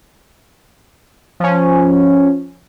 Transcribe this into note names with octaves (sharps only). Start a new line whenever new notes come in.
F3 C#4